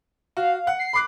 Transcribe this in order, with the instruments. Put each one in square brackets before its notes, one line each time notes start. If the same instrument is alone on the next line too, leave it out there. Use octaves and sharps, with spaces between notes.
[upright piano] F#4 [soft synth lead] F5
[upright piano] F#5
[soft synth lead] C7
[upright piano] B5 D6 F#6